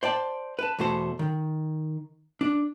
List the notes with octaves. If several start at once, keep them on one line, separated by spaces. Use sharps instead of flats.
C5 D5 G5 A5
B4 A5
E2 B2 A3 F#4 C5 A5
D#3
D4